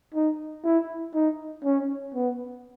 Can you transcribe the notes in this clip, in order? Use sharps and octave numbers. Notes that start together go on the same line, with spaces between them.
D#4
E4
D#4
C#4
B3